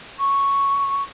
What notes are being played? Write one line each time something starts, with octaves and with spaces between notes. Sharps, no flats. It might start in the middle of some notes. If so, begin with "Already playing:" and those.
C#6